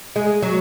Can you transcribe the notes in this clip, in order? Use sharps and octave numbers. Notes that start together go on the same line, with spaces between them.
G#3
F#3